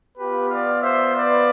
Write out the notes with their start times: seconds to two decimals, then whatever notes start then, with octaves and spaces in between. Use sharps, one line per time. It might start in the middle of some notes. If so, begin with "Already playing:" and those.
0.18 B3 F4 G4 B4
0.50 D5 F5
0.81 C5 E5
1.13 B4 D5